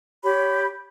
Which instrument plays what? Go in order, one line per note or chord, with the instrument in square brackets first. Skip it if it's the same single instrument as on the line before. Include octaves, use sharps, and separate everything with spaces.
[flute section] G4 C#5 B5